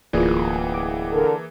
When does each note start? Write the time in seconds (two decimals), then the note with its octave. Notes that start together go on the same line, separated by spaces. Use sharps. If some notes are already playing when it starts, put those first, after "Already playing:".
0.13 D1 E3 A#3 F4 G#4 D5
0.74 D6
1.12 D3 A4 A#4